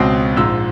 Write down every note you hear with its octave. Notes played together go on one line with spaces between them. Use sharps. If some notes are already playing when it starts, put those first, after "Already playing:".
Already playing: C#2 B2 G#3 C4 D#6
A#1 G#2 F3 E6